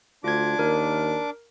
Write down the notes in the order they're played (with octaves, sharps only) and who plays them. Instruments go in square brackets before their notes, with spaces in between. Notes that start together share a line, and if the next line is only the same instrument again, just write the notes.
[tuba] D2 [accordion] D4 D6 [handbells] F4 G#6
[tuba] D#2 [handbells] A#4